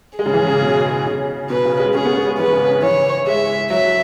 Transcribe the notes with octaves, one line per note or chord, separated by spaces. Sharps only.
G#3 G#4
C#3
E3
C#3
B2
C#3
B2 B4
C#3
G#3
C#4 G#4
B3
B3
G#3
E3 B4
C#3
C#3
E3 C#5
G#3 E5
F#3 E5